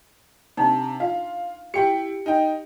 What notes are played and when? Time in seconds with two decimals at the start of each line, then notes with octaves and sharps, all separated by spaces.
0.57 C3 D4 D#4
1.00 F4 F5
1.74 E4 G4 G5 C#7
2.26 D#4 G5